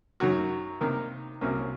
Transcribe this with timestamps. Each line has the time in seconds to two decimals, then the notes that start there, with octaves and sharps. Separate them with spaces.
0.20 F#2 D#3 F#3 F#4
0.81 C3 D#3 A#3 D#4
1.41 C2 C3 F#3 A#3 C#4